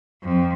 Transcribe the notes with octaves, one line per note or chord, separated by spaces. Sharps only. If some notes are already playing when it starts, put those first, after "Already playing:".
F2